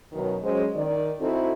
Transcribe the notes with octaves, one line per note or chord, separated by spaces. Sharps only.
F#2 B2 D#3
F#3 G#3 C#4 C5
D#3 D5
C4 D#4 E4 F#4 A4